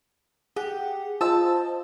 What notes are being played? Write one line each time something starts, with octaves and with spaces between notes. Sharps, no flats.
G4 G#4 F#5
F4 C5 D#5 A5 E6